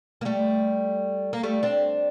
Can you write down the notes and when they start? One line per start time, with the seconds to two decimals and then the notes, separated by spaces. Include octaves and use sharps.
0.21 A#3
0.25 G3 A3
1.33 A#3
1.43 G3 A3
1.63 C4 D4